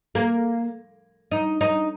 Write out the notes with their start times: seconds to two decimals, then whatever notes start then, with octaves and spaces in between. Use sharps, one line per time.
0.15 A#3
1.31 D#4
1.61 D#4